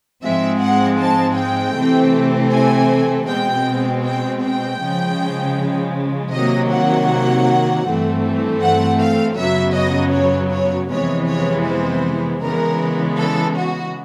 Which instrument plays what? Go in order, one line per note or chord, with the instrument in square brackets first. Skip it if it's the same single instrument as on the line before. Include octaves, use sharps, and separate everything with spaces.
[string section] G#2 F3 G#3 C4 E5
F#5
A5
G5
C3 E3 A3 C4
G#5
B2 G#3 C4 G5
G5
G5
C#3 F3 G#3
C3 D#3 F#3 A#3 D#5
F#5
G2 E3 A3 C4
F#5
F5
F#2 C#3 F#3 B3 E5
D#5
C#5
C#5
F2 C3 E3 G#3 B3 C#5
C#5
C5
C#3 E3 G#3 B3 A#4
A4
F#4